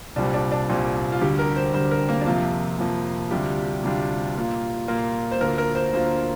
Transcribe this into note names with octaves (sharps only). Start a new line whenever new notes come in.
C2 A#2 G3 C4 D4
D4
D4
C2 A#2 G3 C4
F4
D2 D3 G3 G4
A#4
C5
D2 D3 G3 C5
A#4
A#3
D4
F2 C3 F3 A#3 F4
F2 C3 F3 A#3
D2 C3 G3 D4 F4 G4
D2 C3 G3 D4 F4
A#2 A#3 F4
A#2 A#3 F4
C5
D2 D3 A#3 F4 A#4
A#4
C5
D2 D3 A#3 F4 C5